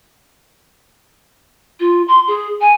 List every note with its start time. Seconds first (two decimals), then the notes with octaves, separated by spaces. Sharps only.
1.80 F4
2.08 C6
2.27 G#4
2.61 G#5